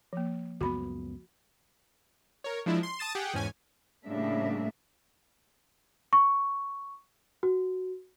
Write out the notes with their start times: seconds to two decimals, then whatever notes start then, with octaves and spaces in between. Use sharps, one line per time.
0.13 F3 A#3
0.61 C#2 F#2 B3 F#4 B5
2.44 A#4 C#5
2.66 F3 G#3 D4 E4
2.83 C6
2.99 A5 D#6 A6 E7
3.15 G4 G#4 F#5 G5
3.33 E2 G#2 C#4 G#5
4.05 A2 C#3 G3 A#3 D4 E5
6.13 C#6
7.43 F#4